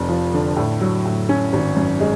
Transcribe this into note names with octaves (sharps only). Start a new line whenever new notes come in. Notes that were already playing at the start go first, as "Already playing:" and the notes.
Already playing: F1 F2
F3
D3
A2
F#3
A2
C#4
G#1
F#2
G#3